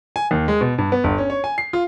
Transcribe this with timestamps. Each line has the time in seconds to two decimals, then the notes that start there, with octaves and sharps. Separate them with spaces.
0.16 G#5
0.31 D#2
0.48 G#3
0.61 B2
0.78 G2
0.92 B3
1.04 G1
1.18 C#4
1.30 C#5
1.44 G#5
1.58 C7
1.73 F4